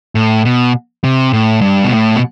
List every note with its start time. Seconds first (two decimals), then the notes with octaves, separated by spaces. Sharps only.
0.15 A2
0.45 B2
1.04 C3
1.33 A2
1.61 G2
1.84 B2
1.92 A2
2.16 B2